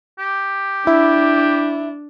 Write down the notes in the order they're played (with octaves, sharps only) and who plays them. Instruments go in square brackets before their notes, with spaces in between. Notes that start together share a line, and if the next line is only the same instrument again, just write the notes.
[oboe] G4
[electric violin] D4 [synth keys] E4